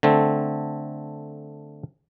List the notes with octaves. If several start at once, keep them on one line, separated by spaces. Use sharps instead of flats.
D3 A3 C4